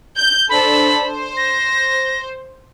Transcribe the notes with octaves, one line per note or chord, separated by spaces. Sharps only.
G6
D4 A4 C5 B5
C5
A#6